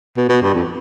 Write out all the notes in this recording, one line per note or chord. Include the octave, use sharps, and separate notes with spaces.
B2
B2
G2
F2